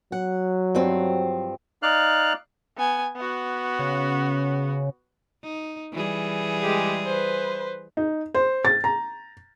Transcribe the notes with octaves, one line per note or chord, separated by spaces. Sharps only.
F#3 F#5
G2 F3 C4
D#4 D5 F5 F6 F#6
B3 G#5
B3 F#4
C#3
D#4
E3 G3 G#4
G#3 G4
B4 C5
D#4
C5
A6
A#5